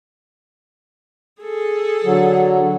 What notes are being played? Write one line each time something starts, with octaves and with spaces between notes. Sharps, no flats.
G#4 A4
D3 F#3